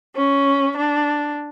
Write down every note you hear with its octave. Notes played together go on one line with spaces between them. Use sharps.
C#4
D4